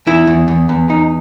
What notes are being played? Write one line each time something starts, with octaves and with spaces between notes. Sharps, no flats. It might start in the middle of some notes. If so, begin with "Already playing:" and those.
E2 E4
E2
E2
E2
E2 D#4